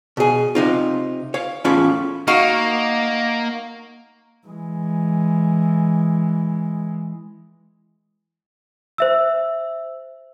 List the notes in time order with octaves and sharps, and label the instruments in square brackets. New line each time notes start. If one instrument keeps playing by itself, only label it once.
[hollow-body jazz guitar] B2 G#4
C3 D#4 F4
C#5 F5
E2 A2 C#4 F4 B5
[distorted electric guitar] A#3 [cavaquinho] D#4 F#4 F5
[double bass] E3 G#3
[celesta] C5 E5 E6